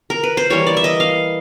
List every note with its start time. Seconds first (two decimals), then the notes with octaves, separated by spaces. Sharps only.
0.10 A#4
0.23 B4
0.37 C5
0.50 E3 G3 A#3 C#5
0.67 D5
0.77 E5
0.84 D#5
1.00 F5